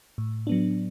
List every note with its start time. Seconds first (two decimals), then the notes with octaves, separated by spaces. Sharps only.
0.18 A2
0.47 F#3 B3 D4